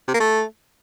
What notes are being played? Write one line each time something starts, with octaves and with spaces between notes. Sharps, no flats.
C3
A#3
A3